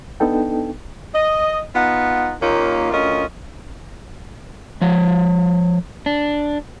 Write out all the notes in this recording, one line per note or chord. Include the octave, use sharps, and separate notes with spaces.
B3 D4 D#4 A4 G5
D#5
B3 D#4 F4 F#5
D#2 A#3 C#4 D#4 F4
D2 C#4 F4 A#4 D#5
F3 C#5
D4